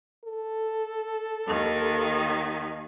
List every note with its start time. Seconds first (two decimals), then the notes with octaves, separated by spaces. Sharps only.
0.24 A4
1.46 D#2 D#3